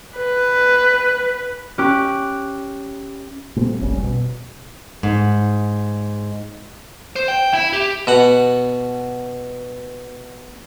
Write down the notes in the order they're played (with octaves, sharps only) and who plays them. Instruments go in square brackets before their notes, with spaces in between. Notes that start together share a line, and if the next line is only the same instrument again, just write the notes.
[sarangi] B4
[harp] C#4 G4 D6 F#6
[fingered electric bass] A#2 G3 A3 C4
F1 A#1 G3 C#4
B2
[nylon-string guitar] G#2
[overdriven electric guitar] C5
G5
E4
G4
[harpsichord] B2 F#5